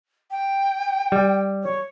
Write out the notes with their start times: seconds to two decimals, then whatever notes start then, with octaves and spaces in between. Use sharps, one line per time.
0.31 G5
1.12 G3
1.63 C#5